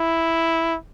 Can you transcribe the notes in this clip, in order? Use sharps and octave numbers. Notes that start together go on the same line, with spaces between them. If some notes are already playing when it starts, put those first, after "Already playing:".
Already playing: E4